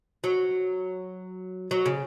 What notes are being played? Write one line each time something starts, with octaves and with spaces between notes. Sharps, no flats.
F#3
F#3
C#3